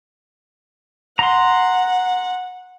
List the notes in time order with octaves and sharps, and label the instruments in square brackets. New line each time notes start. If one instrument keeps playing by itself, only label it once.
[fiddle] F#5 [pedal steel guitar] A#5 C6